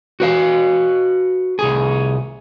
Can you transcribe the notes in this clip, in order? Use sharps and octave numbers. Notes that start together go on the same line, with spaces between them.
F#4 B4 F5
C2 G#4